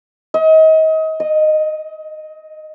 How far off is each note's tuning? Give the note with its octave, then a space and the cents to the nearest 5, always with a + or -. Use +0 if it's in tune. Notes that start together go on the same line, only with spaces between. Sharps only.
D#5 +30
D#5 -10